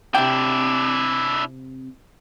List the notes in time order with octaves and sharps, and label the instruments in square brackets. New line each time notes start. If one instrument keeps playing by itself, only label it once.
[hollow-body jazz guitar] C3 G5 [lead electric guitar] D4 E4